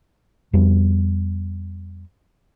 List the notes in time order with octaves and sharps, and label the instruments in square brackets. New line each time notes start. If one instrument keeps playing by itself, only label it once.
[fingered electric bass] F2 G3 B3